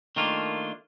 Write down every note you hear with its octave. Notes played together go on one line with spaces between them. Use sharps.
D#3 A3 A#3 D4 F4